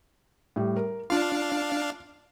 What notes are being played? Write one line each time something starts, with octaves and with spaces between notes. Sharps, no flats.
A2 G3
A#4
D4 F4 F5